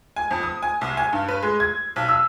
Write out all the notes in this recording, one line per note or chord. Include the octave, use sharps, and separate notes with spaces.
G#5
F2
D#6
G#5
C2
G#5
G2
B4
G#3
G#6
B1
E6